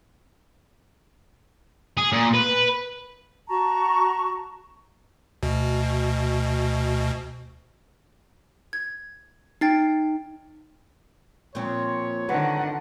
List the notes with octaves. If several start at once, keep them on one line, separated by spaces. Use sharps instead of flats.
G#4
A#2
B4
F#4 A5 A#5 C#6
D2 B2
G#6
D#4 G5 A6 C7
A#2 F3 C4 C#5
D3 D#3 B4 F#5